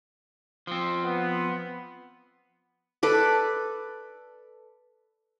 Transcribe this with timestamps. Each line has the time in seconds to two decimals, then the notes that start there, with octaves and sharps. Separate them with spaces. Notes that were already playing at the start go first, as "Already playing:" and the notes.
0.67 F3 C4
1.04 B3
3.03 A4 B4 D5